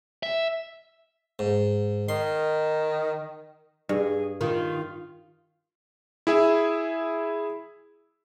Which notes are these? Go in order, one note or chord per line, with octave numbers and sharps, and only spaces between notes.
E5
G#2
D#3 C6
G2 G#4
D#3 F4
E4 G#4 E5